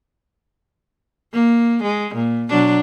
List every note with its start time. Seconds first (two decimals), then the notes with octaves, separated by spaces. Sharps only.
1.32 A#3
1.83 G#3
2.15 A#2
2.49 B2 F#3 D4